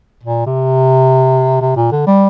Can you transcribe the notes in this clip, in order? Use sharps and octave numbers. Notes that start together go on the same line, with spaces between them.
A#2
C3
C3
A#2
D3
G3